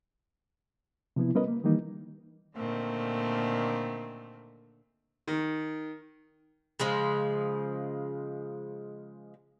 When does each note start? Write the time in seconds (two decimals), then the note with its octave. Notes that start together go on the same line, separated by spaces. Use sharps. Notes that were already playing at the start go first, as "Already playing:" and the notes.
1.16 C3 F3 B3 E4
1.35 G3 B3 C#4 A#4 B4 D#5
1.48 A#3
1.64 D#3 E3 G3 A#3 D#4
2.55 A#2 D3 D#3 A3 C4
5.28 D#3
6.80 C#3 F3 G#3